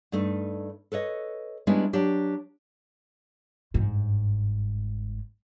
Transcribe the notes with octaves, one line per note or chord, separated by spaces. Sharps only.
G2 A3 D#4
A4 B4 C#5 D#5
G3 G#3 B3 C#4 D4 E4
F#3 D4 G4
G1 G#2